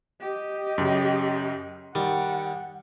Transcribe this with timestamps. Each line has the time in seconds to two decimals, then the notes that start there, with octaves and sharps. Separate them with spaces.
0.21 G4 D#5
0.78 F#2 C#3
1.95 D#3 G3 F#5